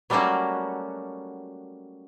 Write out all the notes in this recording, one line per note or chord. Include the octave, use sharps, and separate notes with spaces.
F#3 G3 A3 A#3 C#4 F#4